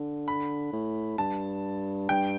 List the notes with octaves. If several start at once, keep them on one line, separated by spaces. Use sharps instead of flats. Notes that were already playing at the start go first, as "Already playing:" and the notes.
Already playing: D3
B5
A2
G2 A5
G2 G5